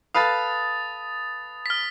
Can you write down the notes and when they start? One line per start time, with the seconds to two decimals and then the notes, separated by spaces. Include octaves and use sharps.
0.15 A4 B4 F5 D#6 A6
1.66 F6 B6